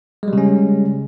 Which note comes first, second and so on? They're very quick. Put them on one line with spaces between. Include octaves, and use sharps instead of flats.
G#3 G3 C#3 C#4